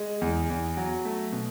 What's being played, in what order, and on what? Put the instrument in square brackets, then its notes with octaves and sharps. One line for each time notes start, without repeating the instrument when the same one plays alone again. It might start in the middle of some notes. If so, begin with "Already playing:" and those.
Already playing: [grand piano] G#3
E2
E2
F#3
A3
B2